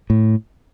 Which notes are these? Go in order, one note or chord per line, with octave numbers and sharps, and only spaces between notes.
A2